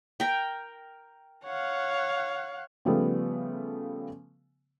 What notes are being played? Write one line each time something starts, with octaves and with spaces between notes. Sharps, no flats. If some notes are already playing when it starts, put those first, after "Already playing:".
A#4 G5
C#5 F5 F#5
C#3 F3 G3 A3 B3